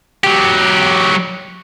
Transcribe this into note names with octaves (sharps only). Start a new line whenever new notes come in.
F#3 G4